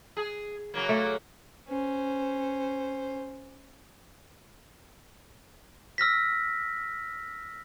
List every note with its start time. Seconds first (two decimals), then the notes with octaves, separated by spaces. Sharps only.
0.17 G#4
0.74 C#3 F#3 A#3
0.89 A3
1.68 C#4 C5
5.98 E6 F6 A#6 B6